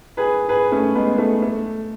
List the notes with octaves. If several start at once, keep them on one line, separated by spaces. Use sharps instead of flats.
G#4 B4
G#4 B4
A3 C#4
G#3 B3
A3
A3